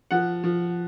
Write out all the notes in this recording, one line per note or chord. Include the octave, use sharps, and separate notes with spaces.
F3 F#5
F3